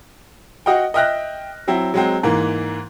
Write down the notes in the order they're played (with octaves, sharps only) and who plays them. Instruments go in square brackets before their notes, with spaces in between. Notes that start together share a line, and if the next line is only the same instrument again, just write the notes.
[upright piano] F#4 D#5 F5 G5
D#5 E5 G5 F6 F#6 A#6
F#3 C4 E4
F#3 G#3 C4
G#2 E3 A#3